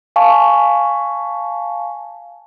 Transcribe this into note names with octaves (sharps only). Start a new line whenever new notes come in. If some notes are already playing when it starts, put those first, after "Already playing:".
F5 G#5 A5 C#6